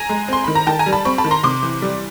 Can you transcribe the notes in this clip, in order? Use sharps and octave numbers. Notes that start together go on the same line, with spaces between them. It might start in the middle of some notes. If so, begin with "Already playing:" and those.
Already playing: G#5 A#5
G#3
C4 C6
D#3 B5
A#5
D#3 G5 A5
G#5 A#5
G3
A5 B5
C4 B5 C#6
A5 B5
D#3
A#5 C6
C3 C6 D6
E3
G3